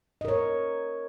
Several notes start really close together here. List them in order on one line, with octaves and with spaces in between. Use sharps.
D#5 A#4 C#5